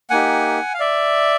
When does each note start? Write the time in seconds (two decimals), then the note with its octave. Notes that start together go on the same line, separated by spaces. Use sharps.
0.10 A#3 D#4 G4 F#5 G#5
0.74 F5
0.80 D5 E5